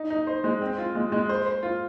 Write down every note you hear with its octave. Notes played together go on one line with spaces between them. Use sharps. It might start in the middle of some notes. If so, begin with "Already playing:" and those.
Already playing: D#4
D#4
C5
G#3
C4
F4
G#3
G#3
C5
C5
F4